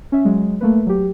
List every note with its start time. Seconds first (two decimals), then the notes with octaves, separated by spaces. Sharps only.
0.12 C#4 E5
0.25 F#3 G#3
0.61 A3 A#3 B4
0.87 F#3 G4